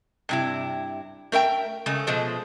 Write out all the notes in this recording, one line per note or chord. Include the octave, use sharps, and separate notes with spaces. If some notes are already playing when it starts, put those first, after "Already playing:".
G2 C3 E4
A3 A#4 E5 G5
C#3 G#3 A3
B2 F3 G#3 C5